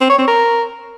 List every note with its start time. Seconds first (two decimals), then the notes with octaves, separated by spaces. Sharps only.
0.01 C4
0.10 C#5
0.19 C4
0.28 A#4